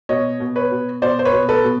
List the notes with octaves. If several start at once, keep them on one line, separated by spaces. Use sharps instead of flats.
B2 C#5 D#5
B2
B4 C#5
B2
B2 C5 D5
C5
B4 C#5
B2
A4 B4
B2